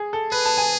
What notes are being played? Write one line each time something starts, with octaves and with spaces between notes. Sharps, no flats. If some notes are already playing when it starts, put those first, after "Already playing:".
Already playing: G#4
A4
G#4 B4
A5
G#5